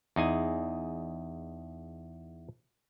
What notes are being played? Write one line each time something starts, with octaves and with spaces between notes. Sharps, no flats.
E2 D#4 G#4 G#5